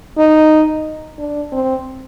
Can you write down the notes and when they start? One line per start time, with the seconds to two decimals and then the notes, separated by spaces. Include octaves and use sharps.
0.18 D#4
1.19 D4
1.52 C4